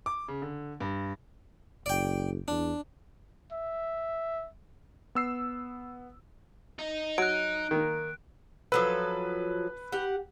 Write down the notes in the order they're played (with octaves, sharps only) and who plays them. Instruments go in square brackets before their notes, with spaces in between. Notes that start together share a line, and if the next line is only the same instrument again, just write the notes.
[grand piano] D6
C#3
D3
G2
[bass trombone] F#1 [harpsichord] D5 G5
[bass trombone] E2 [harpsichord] D4
[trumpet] E5
[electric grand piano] B3 E6 C7
[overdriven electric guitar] D#4
[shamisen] F#3 [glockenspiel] F#6 D7
[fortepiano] D#3 A#3
[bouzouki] F3 F#3 A4 [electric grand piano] B4
[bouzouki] G4 F#5